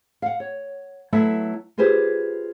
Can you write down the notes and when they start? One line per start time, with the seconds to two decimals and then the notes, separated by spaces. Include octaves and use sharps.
0.22 F5 F#5
0.40 C#5
1.12 F#3 A3 B3 E4 E5
1.78 F4 G4 G#4 B4 C5